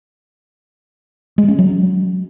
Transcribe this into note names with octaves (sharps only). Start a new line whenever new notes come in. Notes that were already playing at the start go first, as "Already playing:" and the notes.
G#3
C#4
F#3